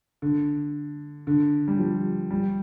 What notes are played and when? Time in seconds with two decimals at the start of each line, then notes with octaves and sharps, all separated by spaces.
0.22 D3
1.27 D3
1.68 G3
1.79 F3
2.31 G3